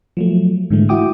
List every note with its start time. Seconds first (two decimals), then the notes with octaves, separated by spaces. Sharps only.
0.17 F3 F#3 A3
0.70 G#2 D3 E3 G#3 A3
0.89 E4 F#4 G5 D6 D#6